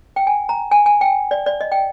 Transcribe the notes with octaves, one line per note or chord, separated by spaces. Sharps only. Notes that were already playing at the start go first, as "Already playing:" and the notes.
G5
G#5
A#5
G#5
G#5
G5
D5
D5
D#5
G5